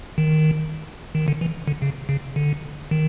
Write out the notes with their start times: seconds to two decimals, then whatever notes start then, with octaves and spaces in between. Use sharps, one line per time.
0.18 D#3
1.15 D#3
1.28 D3
1.41 E3
1.68 D3
1.82 C#3
2.09 C#3
2.36 D3
2.91 D#3